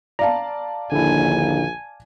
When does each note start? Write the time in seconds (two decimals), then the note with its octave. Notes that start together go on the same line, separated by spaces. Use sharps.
0.19 D5 F5 A5 A#5
0.92 A#1 D#2 A#2 D3 E4 G#5